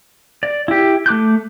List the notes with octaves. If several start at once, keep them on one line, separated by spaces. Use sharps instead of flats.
D5
E4 G4
A3 D6 F#6 G6